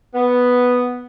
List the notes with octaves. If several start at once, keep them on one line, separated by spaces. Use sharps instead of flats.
B3